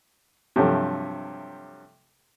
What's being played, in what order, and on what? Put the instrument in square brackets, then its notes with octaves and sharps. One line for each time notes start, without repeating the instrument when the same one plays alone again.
[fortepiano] G2 C3 F3 F#3 A3